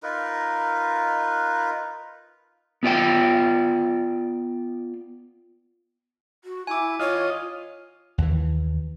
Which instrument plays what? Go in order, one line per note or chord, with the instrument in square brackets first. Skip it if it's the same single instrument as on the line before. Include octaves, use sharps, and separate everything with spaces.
[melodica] D#4 F4 A#4 B4
[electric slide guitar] B3 F4 D5 G5
[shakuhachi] F#4
[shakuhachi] E4 [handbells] G#5 D6
[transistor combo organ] F4 D#5 [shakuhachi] C#5
[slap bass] D#2 E3